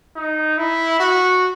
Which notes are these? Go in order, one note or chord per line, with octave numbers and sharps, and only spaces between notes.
D#4
E4
F#4